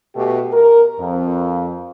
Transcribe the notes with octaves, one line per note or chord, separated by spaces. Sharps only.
B2 A3 G4
A#4
F2